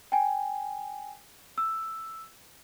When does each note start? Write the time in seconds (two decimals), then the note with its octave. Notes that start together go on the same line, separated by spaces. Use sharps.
0.12 G5 G#5
1.58 E6